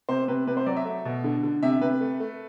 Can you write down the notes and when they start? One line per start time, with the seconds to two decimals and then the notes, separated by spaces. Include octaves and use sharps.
0.09 C3 C5
0.28 C3 B4
0.47 C3 B4
0.57 C5
0.66 F#3 D5
0.77 E5
0.85 A3
1.05 B2
1.24 D3
1.43 D3
1.63 C3 E5
1.81 C3 B4
2.00 A3
2.20 A3